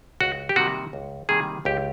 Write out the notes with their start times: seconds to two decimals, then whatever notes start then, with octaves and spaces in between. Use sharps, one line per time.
0.21 C#2 F#4
0.49 G4
0.56 C3 D#3 G3 A#3 F#4
0.93 C#2
1.29 C3 D#3 G3 A#3 G#4
1.65 C#2 G4